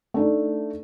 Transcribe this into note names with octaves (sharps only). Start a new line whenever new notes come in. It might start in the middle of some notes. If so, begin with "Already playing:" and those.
A3 D4 D#4